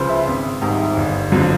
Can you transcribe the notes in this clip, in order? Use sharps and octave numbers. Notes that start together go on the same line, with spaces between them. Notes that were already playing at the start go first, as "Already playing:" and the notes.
Already playing: C#2 C#3 F3 B4 C5
E5
G#1
G#2 D#3 G3
G1
F2 D3 F#3